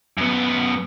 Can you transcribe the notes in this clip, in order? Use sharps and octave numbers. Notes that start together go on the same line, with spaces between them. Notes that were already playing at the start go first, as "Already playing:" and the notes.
F#2 B3